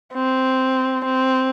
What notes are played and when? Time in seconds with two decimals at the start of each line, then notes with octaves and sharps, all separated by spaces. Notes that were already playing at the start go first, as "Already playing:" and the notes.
0.14 C4
1.05 C4